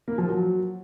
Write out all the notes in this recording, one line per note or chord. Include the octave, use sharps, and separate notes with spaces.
A#3
F3
F#3